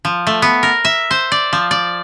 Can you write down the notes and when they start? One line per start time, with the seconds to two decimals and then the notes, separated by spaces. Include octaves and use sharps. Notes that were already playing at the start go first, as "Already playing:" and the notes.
0.05 F3
0.27 A3
0.42 B3
0.63 A#4
0.85 E5
1.11 C5
1.32 D5
1.53 F3
1.71 D5